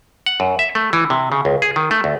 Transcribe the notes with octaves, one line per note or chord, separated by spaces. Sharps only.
F#5
F#2
E5
A3
E3
C3
C#3
C#2
G#4
D#3
A3
D2